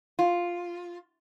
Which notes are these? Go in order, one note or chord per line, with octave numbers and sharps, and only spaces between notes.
F4